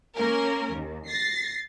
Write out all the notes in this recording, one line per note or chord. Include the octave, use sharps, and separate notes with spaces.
A#3 C#4 A#4
D#2
A6 A#6 C7